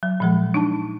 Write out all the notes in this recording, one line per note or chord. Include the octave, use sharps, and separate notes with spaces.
F#3
A#2 F3 G#3
D4 D#4 A5